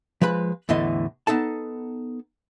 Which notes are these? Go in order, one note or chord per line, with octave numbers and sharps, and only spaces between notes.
F3 G#3 B4 B5
E2 A2 D3 E3 D#5
B3 D#4 A4 A5